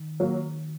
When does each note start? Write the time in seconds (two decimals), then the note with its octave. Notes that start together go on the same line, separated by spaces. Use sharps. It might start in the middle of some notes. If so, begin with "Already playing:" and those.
Already playing: D#3
0.20 F#3 A#3